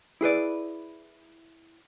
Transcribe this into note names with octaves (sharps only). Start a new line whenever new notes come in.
E4 G#4 B4 D5